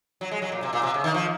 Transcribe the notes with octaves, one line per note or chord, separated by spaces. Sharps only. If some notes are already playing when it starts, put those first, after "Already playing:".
F#3
G#3
F#3
A#2
C3
A#2
C3
C#3
D#3
F3